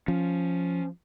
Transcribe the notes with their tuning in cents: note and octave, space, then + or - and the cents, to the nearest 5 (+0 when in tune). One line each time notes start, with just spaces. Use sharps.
F3 +0 C#4 +0